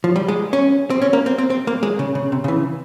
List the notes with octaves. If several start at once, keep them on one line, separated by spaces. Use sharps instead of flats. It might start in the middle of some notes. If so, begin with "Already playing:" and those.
F3
G3
G#3
C#4
C4
C#4
A#3
C4
C4
C4
A#3
G#3
C#3
C#3
C3
C#3
E3